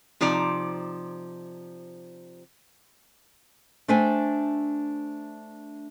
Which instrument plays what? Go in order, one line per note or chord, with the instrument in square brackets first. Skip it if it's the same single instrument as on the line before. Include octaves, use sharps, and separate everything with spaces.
[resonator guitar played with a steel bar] C3 F3 D#4 D5 A#5
[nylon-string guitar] A3 D4 C5 E5 G5 G#5